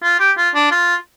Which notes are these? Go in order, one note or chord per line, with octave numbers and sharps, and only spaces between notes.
F4
G4
F4
D4
F4